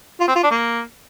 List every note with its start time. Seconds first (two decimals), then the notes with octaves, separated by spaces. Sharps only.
0.20 F4
0.28 C4
0.35 F4
0.43 D4
0.51 A#3